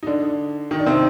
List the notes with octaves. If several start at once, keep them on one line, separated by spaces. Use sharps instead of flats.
D#4
D3 D4
D#3 D#4
D4
C3 C4